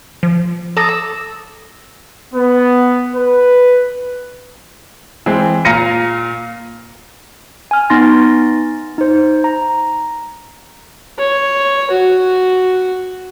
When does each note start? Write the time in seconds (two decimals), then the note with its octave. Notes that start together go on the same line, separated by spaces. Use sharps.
0.23 F3
0.77 A4 A5 A#5 D#6
0.89 E6
2.34 B3
3.14 B4
5.26 E3 G#3 C4
5.65 A#2 F5 A#5 A#6 C#7 D#7
7.71 G#5 F6
7.90 B3 D#4 C6 A6 A#6
8.98 D#4 C5
9.44 A#5
11.19 C#5
11.91 F#4